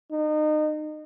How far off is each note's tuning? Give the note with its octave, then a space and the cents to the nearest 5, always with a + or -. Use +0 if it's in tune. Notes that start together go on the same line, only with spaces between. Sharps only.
D#4 -30